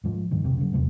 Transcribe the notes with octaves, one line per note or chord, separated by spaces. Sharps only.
G#2 F3
G2 A#2 D#3
F2 C3
F#2 C#3
F1 E2 C3 A3